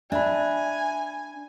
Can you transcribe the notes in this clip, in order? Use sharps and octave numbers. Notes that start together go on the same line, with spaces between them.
D4 E5 G#5 A5 B5